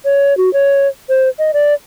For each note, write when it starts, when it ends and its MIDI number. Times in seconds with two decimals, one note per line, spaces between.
0.05 0.36 73
0.37 0.52 66
0.53 0.88 73
1.09 1.29 72
1.39 1.51 75
1.54 1.74 74